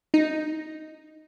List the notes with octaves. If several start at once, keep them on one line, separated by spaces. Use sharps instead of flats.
D#4